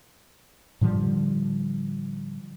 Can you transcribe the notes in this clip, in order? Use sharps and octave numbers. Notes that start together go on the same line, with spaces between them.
A2 D3 F3 G3